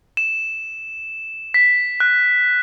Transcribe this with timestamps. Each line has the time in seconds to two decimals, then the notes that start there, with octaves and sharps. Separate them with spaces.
0.17 E7
1.54 B6
2.00 F#6